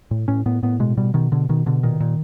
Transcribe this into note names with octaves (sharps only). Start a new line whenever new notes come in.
A2
A2 C#4
A2 B3
A2 B3
B2 G#3
B2 G3
B2 D#3
B2 D3
B2 D#3
B2 D3
A#2 D#3
A#2